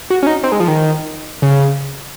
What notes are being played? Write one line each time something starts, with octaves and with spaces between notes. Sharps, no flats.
F#4
C#4
D#4
C4
G#3
F3
D#3
C#3